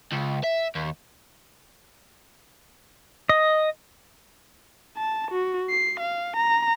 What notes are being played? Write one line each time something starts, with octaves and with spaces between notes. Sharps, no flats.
C#2
E5
D#2
D#5
A5
F#4
C7
F5
A#5